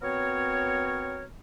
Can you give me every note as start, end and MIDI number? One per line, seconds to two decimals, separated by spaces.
0.02 1.25 59
0.02 1.25 60
0.02 1.25 66
0.02 1.25 70
0.02 1.25 73